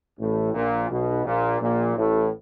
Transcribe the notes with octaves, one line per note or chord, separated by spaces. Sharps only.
A1 A2
A#1 A#2
B1 B2
A#1 A#2
A#1 A#2
A1 A2